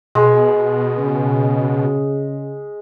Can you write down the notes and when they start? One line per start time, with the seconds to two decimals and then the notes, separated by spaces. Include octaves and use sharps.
0.15 B2 G#3
0.98 C#3